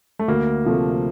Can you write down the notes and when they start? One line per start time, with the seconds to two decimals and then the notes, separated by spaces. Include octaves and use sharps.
0.19 A3
0.28 D2 A#3
0.64 C3 F3 A3